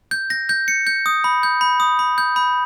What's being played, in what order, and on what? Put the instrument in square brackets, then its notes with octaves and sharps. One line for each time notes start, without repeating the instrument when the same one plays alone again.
[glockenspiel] G6
A#6
G6
C#7
G6
D#6
B5
G6
B5
D#6
B5
G6
B5